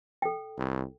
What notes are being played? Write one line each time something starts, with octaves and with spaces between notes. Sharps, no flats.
A4 G5
C2